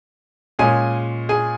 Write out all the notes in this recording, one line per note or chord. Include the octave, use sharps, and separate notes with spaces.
A#2 G#3 C#4 G#4 G#5
G#4 G#5